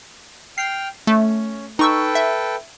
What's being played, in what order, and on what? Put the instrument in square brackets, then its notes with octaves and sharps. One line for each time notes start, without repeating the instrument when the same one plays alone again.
[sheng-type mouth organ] G5 F6 [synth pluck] C7
[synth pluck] A3 [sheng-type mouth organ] C#4
[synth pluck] D#4 C#6 E6 [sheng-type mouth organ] A4 B4 G5
[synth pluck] E5